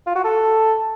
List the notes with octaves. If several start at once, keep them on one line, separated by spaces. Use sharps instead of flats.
F4
F#4
A4